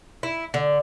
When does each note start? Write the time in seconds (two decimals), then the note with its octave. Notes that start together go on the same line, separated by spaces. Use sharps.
0.23 E4
0.54 D3